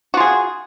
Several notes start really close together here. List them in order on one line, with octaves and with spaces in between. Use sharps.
F#4 F4 G#4